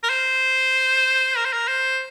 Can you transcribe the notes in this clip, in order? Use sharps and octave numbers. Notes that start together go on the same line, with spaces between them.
A#4
C5
A#4
C5
A#4
C5